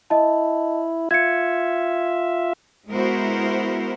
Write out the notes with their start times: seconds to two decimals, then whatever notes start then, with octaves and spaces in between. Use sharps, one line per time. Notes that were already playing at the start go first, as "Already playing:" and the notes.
0.10 E4 D#5 A5
1.11 F4 E5 G#6 C#7
2.89 G#3 B3 E4 F#4 A#4 C5